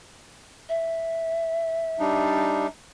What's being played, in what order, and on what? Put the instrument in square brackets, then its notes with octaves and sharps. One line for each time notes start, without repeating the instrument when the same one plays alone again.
[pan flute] E5
[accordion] G3 D4 D#4